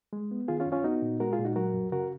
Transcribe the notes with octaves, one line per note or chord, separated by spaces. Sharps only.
G#3
B3
D#3 F4 G#4
C#4 F4
F#2
C#4 F4
B3 D#4 F#4
A#2
G#3 F#4 A#4
F4 G#4
A#2
D#4 F#4
F#3 F#4 A#4
F#2
C#3 F#4 A#4